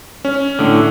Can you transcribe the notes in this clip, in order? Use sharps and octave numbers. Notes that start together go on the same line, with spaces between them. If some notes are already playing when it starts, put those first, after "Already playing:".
C#4
A2 D3